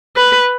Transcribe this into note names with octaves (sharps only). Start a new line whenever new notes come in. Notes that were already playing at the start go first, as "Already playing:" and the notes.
B4